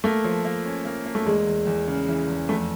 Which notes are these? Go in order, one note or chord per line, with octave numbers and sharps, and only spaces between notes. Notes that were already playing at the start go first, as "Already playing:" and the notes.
A3 A#3
F3
A#3
C#4
A#3
A#3
A3
E2 G#3
E2
E2
C#3
E3
E2
F2 A3